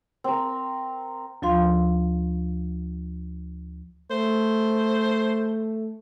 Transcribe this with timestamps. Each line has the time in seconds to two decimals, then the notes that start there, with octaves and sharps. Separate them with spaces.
0.24 C4 A#4
1.42 D2 F3 F4 F5 C6
4.11 A3 C5